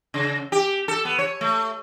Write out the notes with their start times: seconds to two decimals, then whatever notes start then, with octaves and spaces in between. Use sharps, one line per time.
0.14 C#3
0.52 G4
0.88 A4
1.05 B3
1.19 C#5
1.41 A3